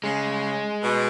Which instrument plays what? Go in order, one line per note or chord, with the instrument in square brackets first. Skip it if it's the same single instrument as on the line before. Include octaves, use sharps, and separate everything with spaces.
[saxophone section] C#3 [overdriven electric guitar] G#3
[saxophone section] B2